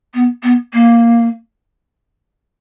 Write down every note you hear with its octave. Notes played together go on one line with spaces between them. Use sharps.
B3
B3
A#3